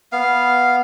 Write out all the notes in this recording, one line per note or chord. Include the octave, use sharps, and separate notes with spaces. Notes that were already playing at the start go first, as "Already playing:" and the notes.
B3 F5